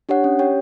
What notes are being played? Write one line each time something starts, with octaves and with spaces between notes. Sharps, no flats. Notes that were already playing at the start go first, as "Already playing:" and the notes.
D4 G4 C#5 F#5
C#4
G4 C#5 G5